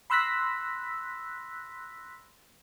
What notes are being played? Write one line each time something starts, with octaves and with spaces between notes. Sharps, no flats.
B5 C6 E6 F#6 A#6 B6